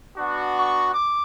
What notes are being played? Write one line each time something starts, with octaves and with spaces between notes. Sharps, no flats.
B3 D4 F#4
C#6
D6